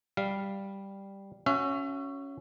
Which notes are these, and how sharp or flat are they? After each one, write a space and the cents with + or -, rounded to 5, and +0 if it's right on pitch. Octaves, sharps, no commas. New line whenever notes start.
G3 +0 F5 -10
C#4 +0 F#4 +0 E5 +30